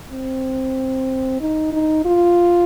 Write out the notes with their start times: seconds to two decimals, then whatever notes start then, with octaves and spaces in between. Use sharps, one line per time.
0.12 C4
1.41 D#4
1.73 D#4
2.05 F4